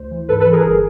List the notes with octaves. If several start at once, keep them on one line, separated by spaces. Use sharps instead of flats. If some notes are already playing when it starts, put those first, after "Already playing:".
Already playing: D2 C5
E3
G#2 A4 B4
A4 B4
E3
G#4 A#4
G1